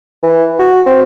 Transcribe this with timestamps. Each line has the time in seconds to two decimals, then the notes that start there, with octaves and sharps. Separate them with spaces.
0.23 E3
0.59 F#4
0.86 C4